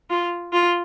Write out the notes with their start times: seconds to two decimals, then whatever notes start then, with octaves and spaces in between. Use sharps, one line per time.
0.10 F4
0.53 F4